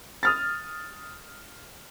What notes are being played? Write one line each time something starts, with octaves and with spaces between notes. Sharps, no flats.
D#6 F6 A6